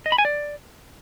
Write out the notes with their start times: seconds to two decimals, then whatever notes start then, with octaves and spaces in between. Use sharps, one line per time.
0.06 D#5
0.12 B5
0.18 G#5
0.25 D5